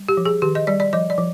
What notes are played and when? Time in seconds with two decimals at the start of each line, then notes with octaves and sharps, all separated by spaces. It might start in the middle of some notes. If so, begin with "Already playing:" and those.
Already playing: G3
0.09 G4
0.17 F3
0.25 G#4
0.42 D#3 G4
0.55 D#5
0.67 G3 D5
0.80 D5
0.93 F3 D#5
1.10 D5
1.18 F3